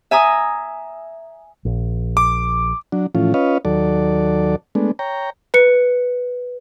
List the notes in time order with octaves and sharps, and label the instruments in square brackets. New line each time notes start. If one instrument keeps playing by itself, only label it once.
[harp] E5 G#5 A#5 D#6
[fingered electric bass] A#1
[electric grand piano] D6
[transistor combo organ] F#3 D4
A2 E3 F3 C#4 F4
C#4 F4 B4 C#5 D#5 F5
D#2 F#3 A4 D5
G#3 A3 B3 D4
C#5 G5 A#5
[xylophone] B4 C#7